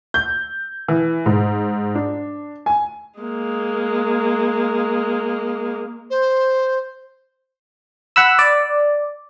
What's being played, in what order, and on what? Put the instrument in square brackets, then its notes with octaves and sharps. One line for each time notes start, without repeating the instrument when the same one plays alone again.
[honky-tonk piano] G6
E3
G#2
D4
G#5
[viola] G#3 A#3
[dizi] C5
[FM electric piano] F#5 B5 E6
D5